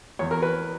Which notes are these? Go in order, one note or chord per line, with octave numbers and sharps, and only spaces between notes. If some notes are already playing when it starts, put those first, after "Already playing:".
E2 C#5
A#4
B4